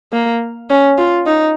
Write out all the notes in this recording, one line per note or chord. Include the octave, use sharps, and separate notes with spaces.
A#3
C#4
F4
D#4